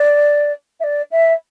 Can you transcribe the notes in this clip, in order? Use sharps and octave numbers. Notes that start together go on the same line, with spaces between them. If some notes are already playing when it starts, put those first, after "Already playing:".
Already playing: D5
E5
D5
E5